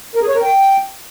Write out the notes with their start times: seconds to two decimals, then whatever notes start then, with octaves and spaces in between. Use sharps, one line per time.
0.15 A#4
0.22 G#4
0.28 C#5
0.35 A#4
0.42 G5